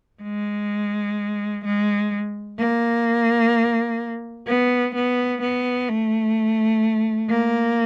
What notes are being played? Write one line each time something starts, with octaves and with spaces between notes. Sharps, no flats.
G#3
G#3
A#3
B3
B3
B3
A3
A#3